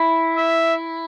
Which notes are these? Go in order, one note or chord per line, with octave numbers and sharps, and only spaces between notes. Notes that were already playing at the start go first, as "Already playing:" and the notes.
Already playing: E4
E5